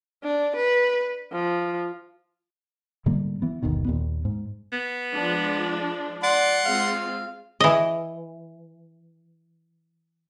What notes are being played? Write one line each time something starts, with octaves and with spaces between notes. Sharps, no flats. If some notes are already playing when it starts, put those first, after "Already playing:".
D4
B4
F3
G#2 D3 G3 A#3
E3 B3
G1 D#2 B2 D#3
D#2 A#2 B3
G#2
B3
F3 G#3 D4
D5 F#5 C6
G#3 C4 F4 F5
E3 D#5